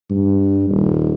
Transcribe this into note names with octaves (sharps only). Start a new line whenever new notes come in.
G2
D#1